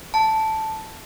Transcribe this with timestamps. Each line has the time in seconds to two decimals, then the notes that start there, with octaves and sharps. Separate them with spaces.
0.14 A5